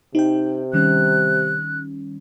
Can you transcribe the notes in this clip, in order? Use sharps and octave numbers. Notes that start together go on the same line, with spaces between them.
C3 D#4 G5
D#3 G3 C#4 F#6